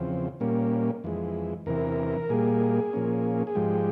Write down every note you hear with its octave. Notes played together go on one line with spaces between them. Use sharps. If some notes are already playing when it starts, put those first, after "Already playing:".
Already playing: E2 C#3 F3 C4
A#2 G3 A#3 C#4
F2 E3 G#3
E2 C3 E3 A#4
A#2 G3 A#3 G#4
A#2 F3 A#3 C#4
G#4
G#2 F3 G#3 G4